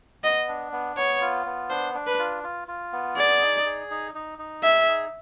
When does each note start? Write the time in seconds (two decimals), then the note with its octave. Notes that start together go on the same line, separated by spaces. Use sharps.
0.23 B3 D#5
0.48 D4
0.72 B3
0.96 B3 C#5
1.21 F4
1.46 B3
1.70 D4 C5
1.94 D4
2.07 B4
2.19 F4
2.44 F4
2.68 F4
2.93 B3
3.17 G#4 D5
3.41 D#4
3.66 G#4
3.90 D#4
4.15 D#4
4.39 D#4
4.63 G#4 E5
4.88 D#4